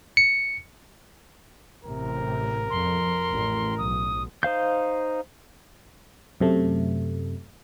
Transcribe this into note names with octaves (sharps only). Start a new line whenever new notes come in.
C#7
A1 A2 C3 A#4
F2 C6
A1
B1 D#6
D#4 C5 F5 G6
F#2 C3 A3